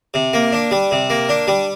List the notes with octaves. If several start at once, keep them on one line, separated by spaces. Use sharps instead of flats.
C3
A#3
D4
G3
C3
A#3
D4
G3